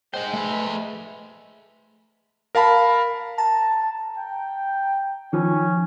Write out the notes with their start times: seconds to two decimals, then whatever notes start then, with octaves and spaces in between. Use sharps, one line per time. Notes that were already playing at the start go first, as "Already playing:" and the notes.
0.14 G#3 G#4 C5 G5
0.33 A3 G#4 B4 E5
2.55 A#4 F5 A5 B5
3.38 A5 A#5
4.18 G5
5.33 D#3 F3 C#4